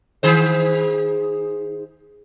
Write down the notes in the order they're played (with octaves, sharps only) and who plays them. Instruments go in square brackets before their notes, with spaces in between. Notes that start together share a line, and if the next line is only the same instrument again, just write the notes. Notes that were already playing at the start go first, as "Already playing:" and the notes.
[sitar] D#3 G#4 C5